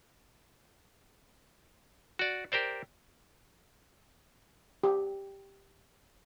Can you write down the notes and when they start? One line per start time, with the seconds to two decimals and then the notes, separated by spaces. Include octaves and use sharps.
2.19 F#4 D5
2.52 G4 A#4 C5 D5
4.83 G4